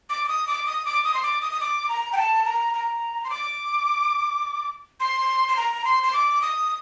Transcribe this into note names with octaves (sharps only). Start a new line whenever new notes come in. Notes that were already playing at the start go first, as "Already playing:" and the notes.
D6
D6
D#6
D6
D#6
D6
D#6
C6
D6
D#6
D#6
D6
A#5
G5
A5
A#5
A#5
C6
D6
C6
C6
A#5
C6
C6
D6
D#6